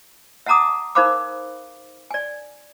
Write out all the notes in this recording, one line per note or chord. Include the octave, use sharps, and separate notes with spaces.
E5 F#5 A5 A#5 D6 D#6
D#4 A#4 C5 F5 B5 D6
D5 G#5